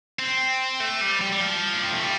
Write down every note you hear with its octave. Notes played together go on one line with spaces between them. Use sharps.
C4
A3
G3
G3
G3
F3
D4
C4
A3
G3